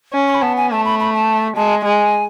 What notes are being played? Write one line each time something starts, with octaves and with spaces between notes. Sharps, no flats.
C#4
C#6
B5
B3 A5
G#5
A3 A5
B5
B5
A5
G#3 A5
G#3 G#5